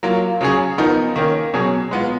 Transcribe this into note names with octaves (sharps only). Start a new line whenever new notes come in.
F#3 A#3 F4
C#3 F#3 C#4 G#4
F3 B3 D#4 A#4
D#3 A#3 C#4
B2 F#3 C#4 G#4
G#3 B3 F4